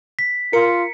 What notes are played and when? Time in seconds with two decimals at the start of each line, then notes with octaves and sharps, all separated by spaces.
0.19 B6
0.53 F4 A#4 C#7